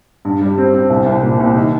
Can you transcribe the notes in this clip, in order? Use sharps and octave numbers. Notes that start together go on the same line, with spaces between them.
G2
G3
C4
C4
C2
C2
A#2
C2
D#3